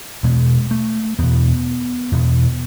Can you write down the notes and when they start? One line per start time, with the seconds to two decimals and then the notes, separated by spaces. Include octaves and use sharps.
0.23 E2 B2 G#3
0.71 A3
1.19 E2 B2 B3
2.12 E2 B2